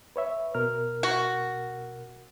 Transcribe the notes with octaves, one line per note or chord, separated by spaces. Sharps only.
B4 C#5 E5
B2 A#4 F6
F#4